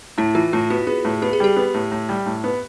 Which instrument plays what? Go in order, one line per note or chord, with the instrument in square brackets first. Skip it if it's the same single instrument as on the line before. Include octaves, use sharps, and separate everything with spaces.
[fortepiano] A2 [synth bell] E4
[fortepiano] E3 [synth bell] F4
[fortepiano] A2 [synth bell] F4
[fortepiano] B3 [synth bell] F#4
[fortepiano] B3 [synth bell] G#4
[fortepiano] A2
[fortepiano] B3 [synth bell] G4
[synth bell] G#4
[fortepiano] G3 [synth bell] G4
[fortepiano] B3
A2
A2
G3
A2
B3